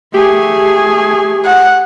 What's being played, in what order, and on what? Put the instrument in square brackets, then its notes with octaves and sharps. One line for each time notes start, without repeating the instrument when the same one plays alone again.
[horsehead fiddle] A3 G#4 [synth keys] G4
[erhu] F#5